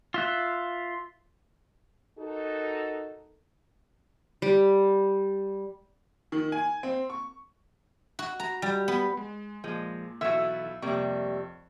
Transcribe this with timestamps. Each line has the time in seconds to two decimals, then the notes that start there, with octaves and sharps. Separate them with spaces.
0.14 F4 E5 F#6
2.18 D#4 F#4 A4 A#4
4.42 G3
6.32 D#3
6.52 G#5
6.83 C4
7.10 C#6
8.19 F#4
8.40 A#5
8.62 G3
8.88 B3
9.17 G#3
9.64 A#2 F3 G#3
10.21 B1 E3 F#4 A4 E5 E7
10.82 F2 C3 G3 A#3 C#6